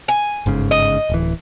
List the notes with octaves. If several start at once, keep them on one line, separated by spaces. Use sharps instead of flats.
G#5
G1 G#2 C#3
D#5
D1 E3